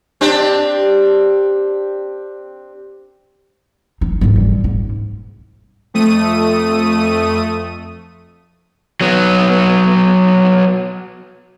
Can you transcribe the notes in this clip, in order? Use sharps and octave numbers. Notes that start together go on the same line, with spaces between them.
C4 D4 G4
D#4
G#2 F3
E3 G3
G#2
F2 A3 D#6 D#7
F#3 B3